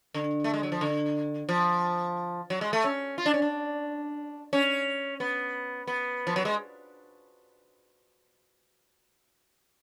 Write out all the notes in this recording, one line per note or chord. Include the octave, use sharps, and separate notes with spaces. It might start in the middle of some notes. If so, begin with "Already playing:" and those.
D3
A3
G#3
F#3
F3
D3
F3
F#3
G#3
A3
C#4
F4
D4
C#4
D4
C#4
B3
B3
F3
F#3
G#3